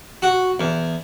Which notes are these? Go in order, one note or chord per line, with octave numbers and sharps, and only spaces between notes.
F#4
E2